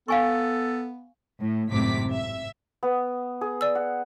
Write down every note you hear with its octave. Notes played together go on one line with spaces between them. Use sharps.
B3 A4 F5 G#5 C#6
A2
G#1 F#2 A2 C3 D6 B6
E5
B3
G#4
D5 E6
F#5